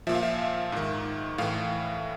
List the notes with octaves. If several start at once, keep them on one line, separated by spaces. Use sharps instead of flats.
A#2 F3 E5
F5
E5
G#2 D#3
A2 E3 F5